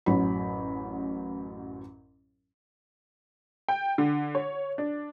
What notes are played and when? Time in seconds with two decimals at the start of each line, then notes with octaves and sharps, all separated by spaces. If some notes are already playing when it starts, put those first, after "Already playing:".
0.06 A1 F#2 F#3 B5
3.68 G5
3.98 D3
4.35 C#5
4.78 D4